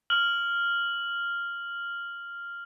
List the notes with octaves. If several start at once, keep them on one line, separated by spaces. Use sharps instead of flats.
F6 F#7